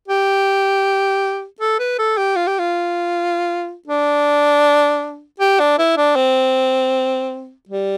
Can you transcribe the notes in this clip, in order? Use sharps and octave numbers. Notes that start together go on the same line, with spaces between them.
G4
A4
B4
A4
G4
F4
G4
F4
D4
G4
D4
E4
D4
C4
G3